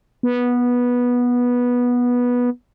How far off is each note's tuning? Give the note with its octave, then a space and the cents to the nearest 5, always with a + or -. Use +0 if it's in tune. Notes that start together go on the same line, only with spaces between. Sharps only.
B3 -15